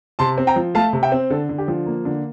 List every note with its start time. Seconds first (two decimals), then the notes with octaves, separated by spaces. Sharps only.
0.19 C3 A5 C6
0.38 C4
0.47 G5 A#5
0.56 F3
0.75 A3 F5 A5
0.93 C3
1.03 E5 G5
1.12 C4
1.30 D3 A4
1.49 D3
1.58 G4
1.68 F3
1.86 A#3
2.05 D3